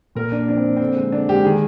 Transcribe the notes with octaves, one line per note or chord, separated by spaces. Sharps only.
A#2 A#4
A#3 D4
F3 D4
C4
A#3
D3 C4
G#3
D3 D4
G#3 G4
D#3 G#4